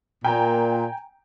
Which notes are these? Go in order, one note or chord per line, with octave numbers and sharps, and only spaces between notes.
A#2 G5 G#5 A#5